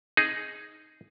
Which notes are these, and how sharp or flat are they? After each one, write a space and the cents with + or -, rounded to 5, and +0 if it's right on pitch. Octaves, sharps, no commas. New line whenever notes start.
C4 +40 D#4 +0 G#4 +0